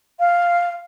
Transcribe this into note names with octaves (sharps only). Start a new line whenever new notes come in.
F5